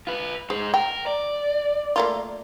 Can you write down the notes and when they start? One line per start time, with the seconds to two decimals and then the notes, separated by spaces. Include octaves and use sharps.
0.07 F4 B4
0.50 G#2 G#4 C5
0.74 A#4 G5
1.07 D5
1.96 A3 A#3 F4